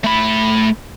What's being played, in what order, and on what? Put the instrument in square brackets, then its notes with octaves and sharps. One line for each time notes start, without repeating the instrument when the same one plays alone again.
[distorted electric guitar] A3 B5